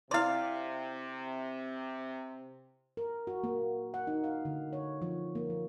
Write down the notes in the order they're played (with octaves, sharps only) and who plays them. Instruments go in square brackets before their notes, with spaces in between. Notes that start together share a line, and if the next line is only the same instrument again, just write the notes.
[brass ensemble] C3 [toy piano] E4 C6 [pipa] D5 F5
[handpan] A#4
F#4
A#3
F#5
D#4
F5
D3
C#5
F3
A#3
F3